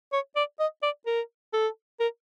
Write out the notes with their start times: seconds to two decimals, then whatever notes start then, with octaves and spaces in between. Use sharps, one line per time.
0.13 C#5
0.36 D5
0.60 D#5
0.83 D5
1.07 A#4
1.54 A4
2.00 A#4